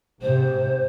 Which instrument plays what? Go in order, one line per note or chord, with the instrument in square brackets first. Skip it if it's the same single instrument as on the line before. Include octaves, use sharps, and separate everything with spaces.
[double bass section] G#2 C3 [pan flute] C5